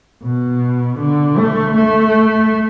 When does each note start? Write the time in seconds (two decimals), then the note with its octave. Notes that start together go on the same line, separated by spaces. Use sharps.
0.23 B2
0.99 D3
1.38 A3
1.76 A3